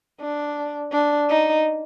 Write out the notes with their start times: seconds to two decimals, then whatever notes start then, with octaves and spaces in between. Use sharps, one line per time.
0.21 D4
0.92 D4
1.30 D#4